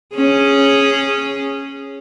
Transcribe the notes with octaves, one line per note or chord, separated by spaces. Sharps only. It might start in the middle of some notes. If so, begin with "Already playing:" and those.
C#4 G#4